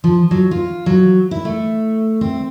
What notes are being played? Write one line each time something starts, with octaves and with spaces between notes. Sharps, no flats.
F3
F#3
F4
F#3
E4
A3
C4